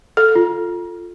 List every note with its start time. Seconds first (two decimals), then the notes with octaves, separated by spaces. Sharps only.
0.17 A4
0.35 F4